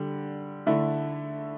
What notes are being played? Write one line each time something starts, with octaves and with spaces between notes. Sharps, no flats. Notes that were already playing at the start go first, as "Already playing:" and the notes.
Already playing: D3 G3
D3 A3 E4